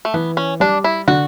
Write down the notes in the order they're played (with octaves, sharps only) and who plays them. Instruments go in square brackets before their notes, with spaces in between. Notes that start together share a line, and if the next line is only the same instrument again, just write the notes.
[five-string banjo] A3
[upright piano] E3 [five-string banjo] B3
[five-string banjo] C#4
[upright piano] G3 [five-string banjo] D4
[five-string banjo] E4
[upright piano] D3 [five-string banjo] F#4